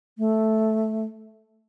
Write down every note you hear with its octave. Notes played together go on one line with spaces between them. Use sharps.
A3